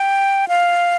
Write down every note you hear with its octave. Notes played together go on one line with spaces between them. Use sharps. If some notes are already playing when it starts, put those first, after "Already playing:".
Already playing: G5
F5